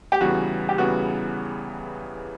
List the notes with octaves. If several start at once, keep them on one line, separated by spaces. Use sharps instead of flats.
G4
E2 C#3 E3 G3 B3 F#4
G4
E2 C#3 E3 G3 B3 F#4